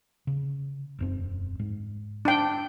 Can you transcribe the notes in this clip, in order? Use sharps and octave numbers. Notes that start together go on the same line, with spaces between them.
C#3
E1 F#2 C4
G#2
D4 G5